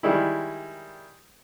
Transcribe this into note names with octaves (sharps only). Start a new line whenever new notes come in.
D#3 G3 G#3 E4